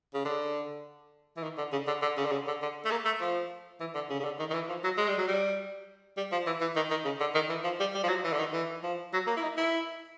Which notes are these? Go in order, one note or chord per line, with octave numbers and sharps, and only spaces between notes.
C#3
D3
E3
D#3
D3
C#3
D3
D3
C#3
D3
C#3
D3
D3
A3
A#3
A3
F3
E3
D3
C#3
C#3
D3
D#3
D#3
E3
F3
F#3
G#3
G3
F#3
G3
G3
F3
E3
E3
D#3
D#3
C#3
D3
D#3
E3
F3
G3
G3
F3
F#3
E3
D3
D#3
E3
F3
F#3
A#3
E4
D#4
E4